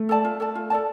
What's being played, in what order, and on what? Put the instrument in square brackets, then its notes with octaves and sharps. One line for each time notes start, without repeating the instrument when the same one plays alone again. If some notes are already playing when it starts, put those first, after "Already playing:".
Already playing: [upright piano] A3
[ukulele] A4 D5 A5
F4
A4 D5 A5
F4
A4 D5 A5